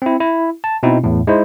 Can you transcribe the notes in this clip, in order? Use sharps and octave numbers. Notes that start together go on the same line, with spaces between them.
C4 E4
E4
A5
B2 C4 D#4 E4
E2 A2
G#3 D#4 E4 C5